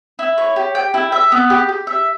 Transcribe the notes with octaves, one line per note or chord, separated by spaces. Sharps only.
E4
C#5
G4
G5
E4
E5
B3
G4
G4
E5